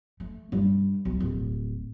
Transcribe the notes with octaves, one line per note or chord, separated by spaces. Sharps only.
A3
G2 G3
B1
D1